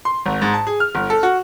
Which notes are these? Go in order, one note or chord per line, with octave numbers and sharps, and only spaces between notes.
C6
G#1
G#2
A5
G#4
F6
G1
A4
F#4